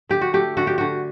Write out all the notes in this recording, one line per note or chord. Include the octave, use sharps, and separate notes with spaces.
D3 G4
F#4
A3 G4
D3 F#4
G4
D3 F#4